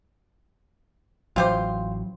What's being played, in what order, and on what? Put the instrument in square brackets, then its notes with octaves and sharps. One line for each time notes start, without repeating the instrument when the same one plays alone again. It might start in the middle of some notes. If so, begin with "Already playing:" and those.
[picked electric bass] A1 E3 F#3 [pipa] F4 G4 C5